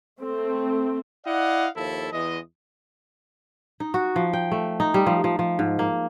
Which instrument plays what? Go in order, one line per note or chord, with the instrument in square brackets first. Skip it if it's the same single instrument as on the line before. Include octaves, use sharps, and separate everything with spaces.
[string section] A3 C4
[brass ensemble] E4 D5 D#5 F5 F#5
D#2 F3 E4 A4
E2 E3 G#3 D#5
[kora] D#4
F#4
F3
G5
A3
D#4
G3
F3
F3
F3
G#2
A#3